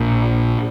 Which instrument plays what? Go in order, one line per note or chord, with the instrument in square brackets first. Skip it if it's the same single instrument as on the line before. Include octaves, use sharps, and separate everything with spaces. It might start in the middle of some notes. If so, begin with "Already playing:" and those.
Already playing: [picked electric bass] A#1 A#2